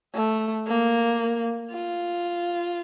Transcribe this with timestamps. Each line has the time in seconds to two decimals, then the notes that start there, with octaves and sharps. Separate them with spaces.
0.15 A3
0.67 A#3
1.72 F4